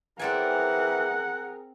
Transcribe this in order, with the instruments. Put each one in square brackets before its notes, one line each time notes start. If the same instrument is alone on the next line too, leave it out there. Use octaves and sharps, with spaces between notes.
[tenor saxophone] E3 [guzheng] C4 D5 G#5 [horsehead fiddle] G#4 A#4 [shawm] F#5